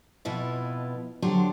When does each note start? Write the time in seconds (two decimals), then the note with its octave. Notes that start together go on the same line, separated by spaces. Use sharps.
0.25 F2 B2 E4 F4 B4
1.22 D3 F#3 D4 G4 A4 C5